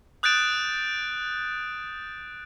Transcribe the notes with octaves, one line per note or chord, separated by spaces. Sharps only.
D#6 F#6 G6 A6 D7 E7